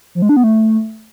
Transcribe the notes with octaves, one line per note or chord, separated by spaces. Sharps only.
F3
G#3
D4
B3
A3